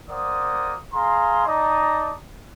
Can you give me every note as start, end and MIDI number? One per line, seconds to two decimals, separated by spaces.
0.10 0.76 58
0.10 0.76 72
0.10 0.76 74
0.10 0.76 78
0.10 0.76 87
0.94 1.43 68
0.94 1.43 77
0.94 1.43 82
0.94 1.43 84
1.46 2.13 63
1.46 2.13 74
1.46 2.13 75
1.46 2.13 81
1.46 2.13 82
1.46 2.13 87